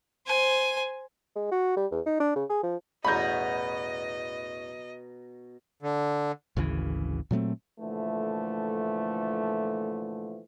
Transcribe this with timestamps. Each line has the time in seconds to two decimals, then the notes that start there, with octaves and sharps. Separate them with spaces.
0.27 C5 G#5
1.35 G#3
1.51 F#4
1.76 G3
1.91 E2
2.06 D#4
2.20 D4
2.35 C#3
2.49 G#4
2.63 F3
3.05 A1 E2 B2 D#5 A#5 B5 C#6 G6
5.82 D3
6.57 G#1 D2 C#3 E3
7.31 A#2 F#3 A3 C4
7.80 A#2 D3 E3 F3 A3